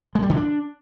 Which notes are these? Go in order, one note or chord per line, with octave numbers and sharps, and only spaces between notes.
G#3
G3
D3
D4